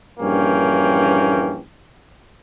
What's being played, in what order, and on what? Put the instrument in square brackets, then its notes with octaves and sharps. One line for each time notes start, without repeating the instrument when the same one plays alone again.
[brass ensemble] A#1 G2 E3 A#3 C#4 G5